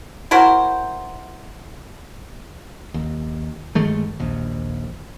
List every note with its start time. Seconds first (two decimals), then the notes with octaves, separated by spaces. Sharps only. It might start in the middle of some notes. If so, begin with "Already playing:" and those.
0.31 E4 F#4 A#4 C5
2.94 D#2
3.75 G1 D#3 G#3 A3
4.20 A#1 D#2